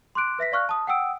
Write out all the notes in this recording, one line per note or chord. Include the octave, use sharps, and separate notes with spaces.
C6 D6 F#6 D7
B4 E5 A#6 B6
D5 F5 C#6 F6 F#6
A5 D#6
F#5 G5 D#6 E6 D7